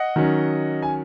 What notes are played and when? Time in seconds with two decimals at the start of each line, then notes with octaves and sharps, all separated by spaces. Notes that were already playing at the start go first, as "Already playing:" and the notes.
Already playing: D#5 F#5
0.16 D#3 F#3 C#4
0.82 G#5